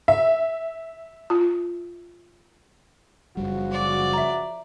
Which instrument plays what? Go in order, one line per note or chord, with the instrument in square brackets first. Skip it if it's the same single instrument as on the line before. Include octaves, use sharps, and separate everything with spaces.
[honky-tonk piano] E5
[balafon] F4
[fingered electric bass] F#1 G3 [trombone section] C#3 F3 F#4
[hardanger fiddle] D5
[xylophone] E5 A#5